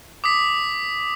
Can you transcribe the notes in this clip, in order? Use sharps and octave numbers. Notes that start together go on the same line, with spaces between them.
D6 D#6 B6